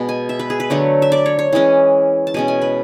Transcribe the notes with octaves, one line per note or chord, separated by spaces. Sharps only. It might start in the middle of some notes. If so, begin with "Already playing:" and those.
Already playing: B2 G#3 B3
G#5
E5
B4
G#4
B4
D3 F#3 A3 C#5
E5
D5
C#5
C#5
E3 G#3 C#4
A5
B2 G#3 C#4 G#5
G#5
B4